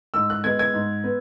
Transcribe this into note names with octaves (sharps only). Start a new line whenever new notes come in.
G#2 E6
F#6
G#3 B3 G#6
G#6
G#2
B3